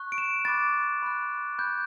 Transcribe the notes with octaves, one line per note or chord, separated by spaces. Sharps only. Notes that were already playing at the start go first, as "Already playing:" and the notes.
Already playing: C#6 F#6
D7
E7
B5 D6 F#6 A6
B5 F#6
B5 F#6 G6